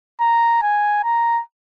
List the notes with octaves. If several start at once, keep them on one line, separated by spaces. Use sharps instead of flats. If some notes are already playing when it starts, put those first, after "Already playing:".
A#5
G#5
A#5